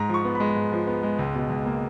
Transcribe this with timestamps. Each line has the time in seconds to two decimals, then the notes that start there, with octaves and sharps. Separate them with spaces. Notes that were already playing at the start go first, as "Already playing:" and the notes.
Already playing: G#2 A#5
0.09 F3
0.14 C#6
0.25 B3
0.35 B5
0.40 G#3
0.56 G#2
0.72 F3
0.87 B3
1.03 G#3
1.19 C#2
1.35 B2
1.50 C#2
1.66 A#3